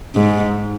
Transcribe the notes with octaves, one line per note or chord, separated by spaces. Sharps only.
G#2